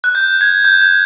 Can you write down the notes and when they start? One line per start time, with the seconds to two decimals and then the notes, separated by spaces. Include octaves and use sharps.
0.04 F#6
0.15 G6
0.41 G#6
0.65 G6
0.81 G#6